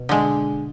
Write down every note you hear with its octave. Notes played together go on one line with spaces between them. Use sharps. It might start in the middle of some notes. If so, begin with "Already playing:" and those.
Already playing: B2
D3 G#3